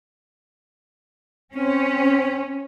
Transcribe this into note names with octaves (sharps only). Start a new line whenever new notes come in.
C4 C#4